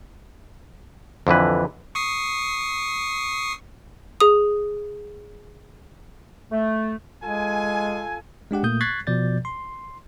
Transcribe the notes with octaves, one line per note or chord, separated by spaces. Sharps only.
F2 D3 E3 B4
C#6 D#6 C7
G#4 D#6
A3
G#3 F4 A4 G#5
G#3 D4 G4 F#5
A#2 A3 A#3 D#6 G6
C#6 F#6 G#6 A6 B6 C7
B2 F3 D5 G6 A6
C6